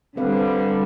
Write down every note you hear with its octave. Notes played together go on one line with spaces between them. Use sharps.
D3 G3 C4 B4 F5